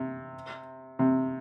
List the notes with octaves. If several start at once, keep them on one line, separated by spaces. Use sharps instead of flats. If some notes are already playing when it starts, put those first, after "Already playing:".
Already playing: C3
C3